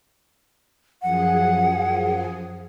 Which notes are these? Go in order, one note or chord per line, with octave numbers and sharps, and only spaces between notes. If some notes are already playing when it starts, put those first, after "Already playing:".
F#2 F3 G#4 F#5